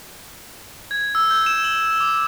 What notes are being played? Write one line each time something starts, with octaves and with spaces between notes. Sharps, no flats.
G#6
E6
G6
E7
F#7
D6